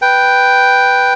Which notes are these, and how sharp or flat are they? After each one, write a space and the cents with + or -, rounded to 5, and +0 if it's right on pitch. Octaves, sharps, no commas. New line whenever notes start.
B4 +0 G5 +0